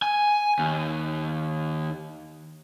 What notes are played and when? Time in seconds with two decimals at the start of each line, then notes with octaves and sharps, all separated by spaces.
0.02 G#5
0.59 D#2